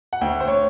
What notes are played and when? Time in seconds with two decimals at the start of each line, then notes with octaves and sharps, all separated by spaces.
0.13 F#5
0.21 D2 G5
0.41 C5
0.48 C#5